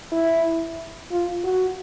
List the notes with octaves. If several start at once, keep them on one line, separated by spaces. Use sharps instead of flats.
E4
F4
F#4